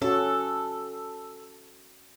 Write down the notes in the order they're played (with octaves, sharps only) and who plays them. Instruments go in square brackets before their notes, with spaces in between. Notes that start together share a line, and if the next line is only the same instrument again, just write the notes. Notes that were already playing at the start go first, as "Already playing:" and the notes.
[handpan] C#4 F#4 [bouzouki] A4